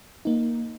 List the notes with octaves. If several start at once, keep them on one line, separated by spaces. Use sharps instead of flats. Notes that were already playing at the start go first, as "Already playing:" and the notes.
A#3 D#4